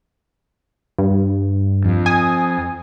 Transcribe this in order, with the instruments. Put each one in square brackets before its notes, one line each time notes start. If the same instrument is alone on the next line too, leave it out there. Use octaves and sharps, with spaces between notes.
[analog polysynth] G2
[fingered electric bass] F2
[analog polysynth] G#5 D#6